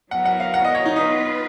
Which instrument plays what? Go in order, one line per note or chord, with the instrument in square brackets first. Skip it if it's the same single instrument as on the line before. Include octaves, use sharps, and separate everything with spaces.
[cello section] F#3 B3 F#4 A#4 [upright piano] F#5
[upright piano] F#5
F5
F#5
D#5
C#5
D#4
[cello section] B3 F4 B4 [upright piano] D#4